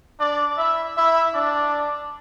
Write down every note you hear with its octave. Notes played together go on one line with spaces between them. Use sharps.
D4 D5
E4 E5
E4 E5
D4 D5